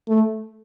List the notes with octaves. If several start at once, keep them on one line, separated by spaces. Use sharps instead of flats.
A3